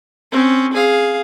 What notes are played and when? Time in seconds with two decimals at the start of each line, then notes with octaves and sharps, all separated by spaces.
0.31 C4 C#4
0.73 G#4 F5